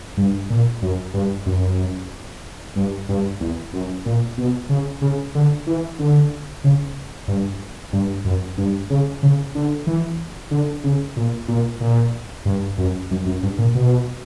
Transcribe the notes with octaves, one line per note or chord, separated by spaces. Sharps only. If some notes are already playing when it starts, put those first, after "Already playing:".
G2
A#2
F#2
G2
F#2
G2
G2
E2
F#2
A#2
B2
C#3
C#3
D3
E3
D3
C#3
G2
G2
F#2
G2
C#3
C#3
D3
E3
D3
C#3
A#2
A#2
A#2
G2
F#2
F#2
F#2
G2
A#2
B2